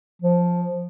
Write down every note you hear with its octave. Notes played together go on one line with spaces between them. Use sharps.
F3